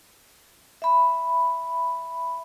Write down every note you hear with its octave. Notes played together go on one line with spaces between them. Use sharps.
E5 B5